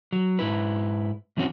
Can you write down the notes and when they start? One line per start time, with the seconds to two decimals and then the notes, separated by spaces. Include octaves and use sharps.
0.13 F#3
0.39 G#2 E4 B4
1.37 G2 E3 C4 C#4 F#4